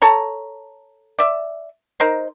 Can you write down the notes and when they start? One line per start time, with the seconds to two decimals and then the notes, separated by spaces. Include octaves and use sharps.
0.02 A4 C#5 A#5
1.19 D5 E5
2.00 D#4 A#4 C5